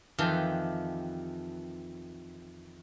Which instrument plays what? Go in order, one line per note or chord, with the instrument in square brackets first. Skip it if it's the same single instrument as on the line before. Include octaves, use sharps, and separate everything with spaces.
[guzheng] F2 D#3 E3 G4 C6